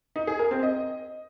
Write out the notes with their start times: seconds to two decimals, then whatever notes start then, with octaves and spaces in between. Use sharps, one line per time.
0.16 D#4
0.27 G#4
0.39 A#4
0.51 C4
0.63 D#5